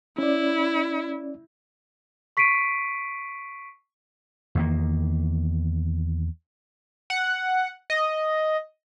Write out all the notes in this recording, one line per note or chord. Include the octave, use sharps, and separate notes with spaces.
C#4 E4 D5
C#6 B6 C7 D7 D#7
E2 D#3 A#3
F#5
D#5